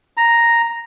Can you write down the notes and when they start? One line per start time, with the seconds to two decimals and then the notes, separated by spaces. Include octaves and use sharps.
0.17 A#5